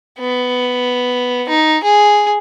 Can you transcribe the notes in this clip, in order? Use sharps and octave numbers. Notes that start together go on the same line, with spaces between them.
B3
D#4
G#4